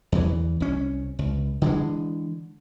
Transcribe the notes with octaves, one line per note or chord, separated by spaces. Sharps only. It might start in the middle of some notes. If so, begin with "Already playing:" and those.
E2 E3
C2 C#4
C#2
D3 E3 G#3